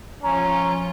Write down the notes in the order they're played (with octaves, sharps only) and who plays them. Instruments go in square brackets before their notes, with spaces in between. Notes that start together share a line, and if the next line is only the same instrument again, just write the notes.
[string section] F3 F4 [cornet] C#4 [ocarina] A#5